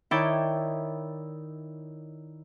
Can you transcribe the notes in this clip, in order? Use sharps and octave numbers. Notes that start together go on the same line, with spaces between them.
D#3 E4 C#5 D5 G5 G6